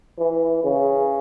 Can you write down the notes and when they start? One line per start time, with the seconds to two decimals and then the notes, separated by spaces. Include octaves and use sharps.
0.18 E3
0.64 C#3